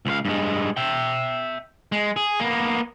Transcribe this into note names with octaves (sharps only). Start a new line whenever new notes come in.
C#2 F5
G2 G#3
E5 G5
G#3
G#4
A#3 B3